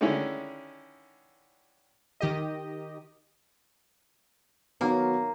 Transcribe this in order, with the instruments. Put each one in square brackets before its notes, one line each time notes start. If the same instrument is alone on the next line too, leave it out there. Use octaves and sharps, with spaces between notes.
[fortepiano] D3 D#3 G#3 C#4 E4
[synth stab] D#3 G4 D#5
[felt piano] D#3 B3 [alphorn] F#3 [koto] A#3 [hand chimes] F5 A#5